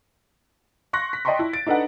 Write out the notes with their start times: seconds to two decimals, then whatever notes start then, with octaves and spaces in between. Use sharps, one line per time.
0.93 C6 C#6 F#6 A#6
1.13 B6
1.25 D5 D#5 G5 A5 C6 C#6
1.39 E4
1.53 A6 D7
1.67 D4 D#4 A4 B4 F#5